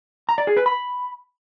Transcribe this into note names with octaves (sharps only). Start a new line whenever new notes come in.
A#5
D5
G#4
B4
B5